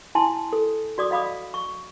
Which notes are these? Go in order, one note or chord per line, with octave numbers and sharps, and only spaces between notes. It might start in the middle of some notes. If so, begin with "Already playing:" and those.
E4 G#5 A5 C6
A4
F#4 D5 D6 D#6
D#5 F5 B5 D6 D#6
C#6